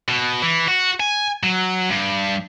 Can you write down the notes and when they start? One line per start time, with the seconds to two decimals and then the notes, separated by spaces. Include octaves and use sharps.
0.08 B2
0.42 E3
0.68 F#4
1.00 G#5
1.43 F#3
1.90 G2